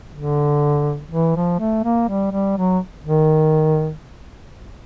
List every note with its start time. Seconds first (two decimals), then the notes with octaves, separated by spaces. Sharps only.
0.15 D3
1.11 E3
1.36 F3
1.59 A3
1.84 A#3
2.09 G3
2.32 G3
2.57 F#3
3.05 D#3